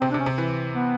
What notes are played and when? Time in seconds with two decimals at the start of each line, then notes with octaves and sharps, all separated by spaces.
0.01 C3 C4
0.11 D4
0.14 C3
0.20 C#4
0.26 C3
0.38 E3
0.75 B3